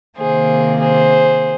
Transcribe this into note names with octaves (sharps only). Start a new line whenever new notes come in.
C3 D#3 A#3 G#4 C5
G#4 C5